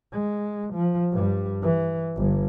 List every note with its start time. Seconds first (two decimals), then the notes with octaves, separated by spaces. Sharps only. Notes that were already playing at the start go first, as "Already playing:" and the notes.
0.12 G#3
0.74 F3
1.12 G2 G3
1.62 E3
2.17 G1 G2